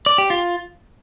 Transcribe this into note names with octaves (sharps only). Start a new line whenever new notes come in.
D5
G4
F4